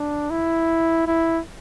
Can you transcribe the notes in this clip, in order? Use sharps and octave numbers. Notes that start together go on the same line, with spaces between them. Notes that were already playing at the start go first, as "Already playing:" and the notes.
Already playing: D4
E4
E4